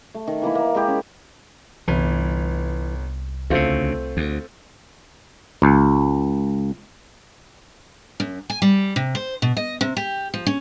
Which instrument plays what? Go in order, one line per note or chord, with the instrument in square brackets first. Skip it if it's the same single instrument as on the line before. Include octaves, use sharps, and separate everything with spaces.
[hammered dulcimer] A3
D#3
E3 A#3 E4 B5
A#3
G#3 E4 G4
C#4
[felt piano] G1 [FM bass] C2 [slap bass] E3
[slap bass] D2 C#3 [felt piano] A3 C4 F4
[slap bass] D2
[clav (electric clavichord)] C#2
[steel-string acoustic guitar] F#2
G#5
G3
C3
C5
B2
D#5
C3
G4
F3
C#4